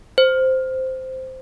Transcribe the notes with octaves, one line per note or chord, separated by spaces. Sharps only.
C5